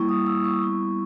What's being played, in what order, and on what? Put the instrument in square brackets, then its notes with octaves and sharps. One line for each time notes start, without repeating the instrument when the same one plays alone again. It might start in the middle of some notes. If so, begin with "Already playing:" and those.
Already playing: [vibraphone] G3 A#3 E4 C#6
D#6
E6
C#6
G3 B3 E4